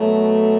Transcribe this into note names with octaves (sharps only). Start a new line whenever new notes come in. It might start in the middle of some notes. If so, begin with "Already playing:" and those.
Already playing: B2 F#3 A3